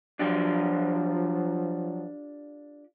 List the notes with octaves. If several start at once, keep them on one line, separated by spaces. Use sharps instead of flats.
F3 F#3 D4 F4 G4